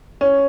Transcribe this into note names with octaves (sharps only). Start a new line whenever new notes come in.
C#4